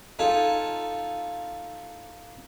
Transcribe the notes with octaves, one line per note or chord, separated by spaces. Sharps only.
D#4 F4 A4 G#5